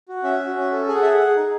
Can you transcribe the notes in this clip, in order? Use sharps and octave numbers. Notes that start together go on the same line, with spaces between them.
F#4
C#4 E5
F#4
C#4
A4
G#4 G#5
F#5
G#4 E5
F#5
G#4
D#4